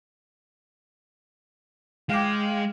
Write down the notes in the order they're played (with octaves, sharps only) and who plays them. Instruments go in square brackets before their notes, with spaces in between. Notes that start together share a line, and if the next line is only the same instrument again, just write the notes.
[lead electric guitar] G#3 [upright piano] F5 G5 D6